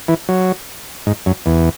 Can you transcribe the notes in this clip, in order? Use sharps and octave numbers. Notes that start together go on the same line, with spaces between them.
E3
F#3
G#2
F#2
E2